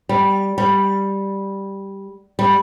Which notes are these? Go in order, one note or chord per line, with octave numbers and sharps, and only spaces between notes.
G3
G3
G3